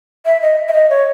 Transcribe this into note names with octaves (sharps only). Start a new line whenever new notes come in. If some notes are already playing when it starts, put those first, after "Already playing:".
E5
D#5
E5
D#5
C#5